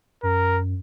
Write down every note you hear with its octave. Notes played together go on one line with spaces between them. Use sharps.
F#2 A#4